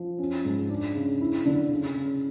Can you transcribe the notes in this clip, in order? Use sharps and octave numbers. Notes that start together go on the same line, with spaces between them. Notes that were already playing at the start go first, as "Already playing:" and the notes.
Already playing: F3
C#4
G#2
D4
C#3
E4
D3
C#3
C#3